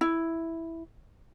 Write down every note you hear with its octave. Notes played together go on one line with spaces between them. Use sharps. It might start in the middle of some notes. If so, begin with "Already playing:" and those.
E4